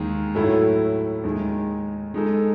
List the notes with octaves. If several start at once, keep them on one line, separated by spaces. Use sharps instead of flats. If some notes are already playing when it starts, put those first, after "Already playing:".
Already playing: D#2 D#3 G#3
A2 F#3 A3 E4 A4
D#2 D#3 G#3
G#3 D#4 A4